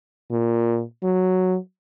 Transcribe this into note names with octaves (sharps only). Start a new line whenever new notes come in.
A#2
F#3